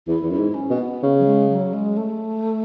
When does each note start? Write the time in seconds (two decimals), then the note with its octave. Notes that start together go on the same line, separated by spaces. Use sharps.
0.07 E2 E4
0.23 E2
0.31 F#2 E4
0.38 G#2
0.54 C#4
0.70 B2
0.78 B3
1.03 C#3
1.19 F#3
1.26 G#3
1.50 F#3
1.73 G#3
1.97 A3